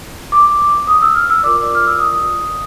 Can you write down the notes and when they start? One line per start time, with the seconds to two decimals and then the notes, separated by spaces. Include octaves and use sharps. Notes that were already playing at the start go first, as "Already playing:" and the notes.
0.32 D6
0.87 D#6
1.02 E6
1.15 F6
1.30 E6
1.43 F4 A#4 D5 D6
1.75 F6
1.87 E6
1.99 D#6